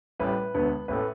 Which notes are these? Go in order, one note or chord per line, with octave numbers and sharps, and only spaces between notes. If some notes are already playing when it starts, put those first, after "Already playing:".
A1 A2 G3 B4
E1 D2 D3 B3
A1 A2 A3 B4